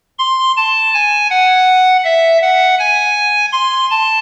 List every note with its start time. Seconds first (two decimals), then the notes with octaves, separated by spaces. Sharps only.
0.19 C6
0.57 A5
0.94 G#5
1.30 F#5
2.04 E5
2.42 F#5
2.79 G#5
3.53 C6
3.91 A5